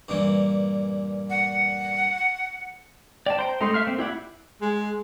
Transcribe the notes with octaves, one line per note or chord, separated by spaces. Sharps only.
G2 A#2 E3
F#5
D5 G5 A5
C5 G5 A#5
A3 D#4 C6 C7
E5 F5 F6
A#3 C4
E4 G4 D5 F#5
G#3